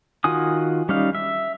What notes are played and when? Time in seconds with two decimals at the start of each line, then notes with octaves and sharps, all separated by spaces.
0.24 D#3 F4 F#4 G#5 D#6
0.89 G3 C#4 D#4 F5
1.15 E5